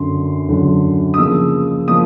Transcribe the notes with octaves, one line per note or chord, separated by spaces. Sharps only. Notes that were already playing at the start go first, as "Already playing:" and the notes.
Already playing: F#2 D3 F#3 C6
F#2 D3 F#3
D#6
C#3 F3 A#3 E6
F3 A#3 D#6